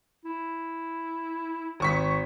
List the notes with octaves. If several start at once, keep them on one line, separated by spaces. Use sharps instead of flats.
E4
G#1 C#6 B6